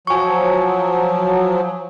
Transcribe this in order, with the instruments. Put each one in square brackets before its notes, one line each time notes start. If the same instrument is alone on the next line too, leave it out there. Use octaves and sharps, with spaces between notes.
[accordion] F3 F#3 [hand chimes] G#5 C#6